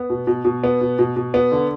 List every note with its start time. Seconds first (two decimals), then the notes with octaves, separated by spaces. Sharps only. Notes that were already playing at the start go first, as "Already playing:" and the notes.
Already playing: B3
0.10 B2
0.27 B2
0.45 B2
0.64 B3
0.81 B2
0.99 B2
1.16 B2
1.34 B3
1.52 D3